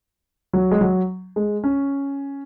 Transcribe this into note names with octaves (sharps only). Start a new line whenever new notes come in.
F#3
G#3
F#3
G#3
C#4